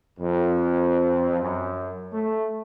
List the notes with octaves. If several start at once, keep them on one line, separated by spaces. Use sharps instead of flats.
F2
F#2
A3